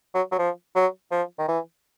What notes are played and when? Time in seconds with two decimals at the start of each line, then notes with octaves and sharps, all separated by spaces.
0.15 F#3
0.32 F#3
0.39 F3
0.75 F#3
1.12 F3
1.38 D#3
1.48 E3